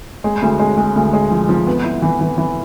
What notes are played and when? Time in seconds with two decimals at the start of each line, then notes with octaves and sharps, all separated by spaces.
0.24 G#3
0.42 D2
0.59 G#3
0.78 G#3
0.96 D2
1.13 G#3
1.31 F3
1.49 F3
1.67 B3
1.84 E4
2.02 E3
2.21 E3
2.38 E3